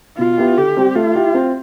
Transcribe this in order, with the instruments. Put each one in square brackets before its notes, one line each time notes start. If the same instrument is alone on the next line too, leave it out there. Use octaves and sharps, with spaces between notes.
[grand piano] B2 [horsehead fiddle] F4
[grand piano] B3 E4 G4
[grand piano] D3 [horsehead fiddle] G4
[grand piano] G3 C4
[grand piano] A3 [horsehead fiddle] F4
[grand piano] E4 G4
C4